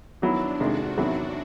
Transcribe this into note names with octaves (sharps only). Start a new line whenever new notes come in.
D#3 F#3 B3 D4 E4
F2 C3 D#3 G#3 F#4
E2 C3 D#3 F#3 B3